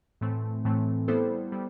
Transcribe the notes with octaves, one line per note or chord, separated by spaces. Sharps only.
A2 E3 A3 C4
A2 E3 A3 C4
G3 B3 E4 A4 C5
G3 B3 E4